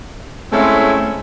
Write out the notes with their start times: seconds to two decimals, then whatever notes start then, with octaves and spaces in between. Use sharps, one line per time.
0.52 G#3 A3 C4 C#4 E4 E5